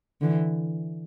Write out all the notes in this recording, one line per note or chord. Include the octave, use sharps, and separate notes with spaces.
D3 E3